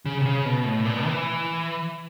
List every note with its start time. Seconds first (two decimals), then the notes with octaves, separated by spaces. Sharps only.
0.06 C#3
0.20 C3
0.25 C#3
0.45 B2
0.65 A2
0.85 A#2
1.05 E3